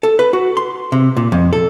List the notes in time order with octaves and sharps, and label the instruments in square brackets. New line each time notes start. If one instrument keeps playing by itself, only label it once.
[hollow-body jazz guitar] A4
B4
F#4
C6
C3
A#2
F2
A4